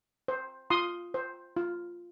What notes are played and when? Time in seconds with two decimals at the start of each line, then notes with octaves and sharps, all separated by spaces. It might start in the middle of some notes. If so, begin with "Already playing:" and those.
0.28 C5
0.70 F4 C6 D#6
1.14 C5
1.57 F4